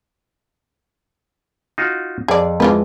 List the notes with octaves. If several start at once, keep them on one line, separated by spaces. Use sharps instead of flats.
D#4 F4 F#4
F2 G#4 D5
E3 G#3 F4 B4